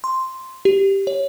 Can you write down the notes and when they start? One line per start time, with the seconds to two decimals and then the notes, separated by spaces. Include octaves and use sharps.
0.04 C6
0.65 G4
1.07 C#5